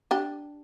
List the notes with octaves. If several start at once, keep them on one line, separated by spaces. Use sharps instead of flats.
D4 G4